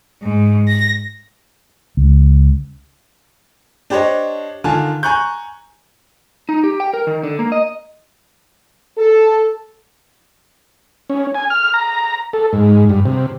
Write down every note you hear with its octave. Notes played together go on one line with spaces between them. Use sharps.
G#2
A#6
C#2
D4 G4 C5 C#5 D#5
D3 D#3 F4 G#5 A5
G#5 A#5 C#6 F#6 G6
D#4
G4
G5
A#4
D#3
D3
A#3
D#5
A4
C#4
G#5
F6
A#5
A4
G#2
G2
C3